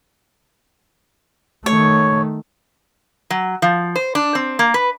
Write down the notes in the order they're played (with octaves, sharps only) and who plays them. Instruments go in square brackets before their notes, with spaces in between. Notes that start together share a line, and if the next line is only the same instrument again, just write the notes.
[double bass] D#3 A3 [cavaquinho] C#5
[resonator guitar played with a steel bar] F#3
F3
C5
D4
C4
A#3
B4